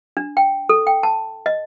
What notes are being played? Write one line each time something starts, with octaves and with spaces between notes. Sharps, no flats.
D4
G5
A4
G5
A5
D#5